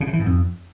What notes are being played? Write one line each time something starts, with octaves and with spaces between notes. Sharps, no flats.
C#3
C3
E3
G#2
F2